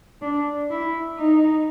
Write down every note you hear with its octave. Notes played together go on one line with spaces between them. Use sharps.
D4
E4
D#4